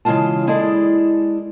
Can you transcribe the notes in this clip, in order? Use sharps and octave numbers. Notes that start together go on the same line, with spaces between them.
C#3 E3 G#3 F4 A5
G#3 E4 G#4 A4 D5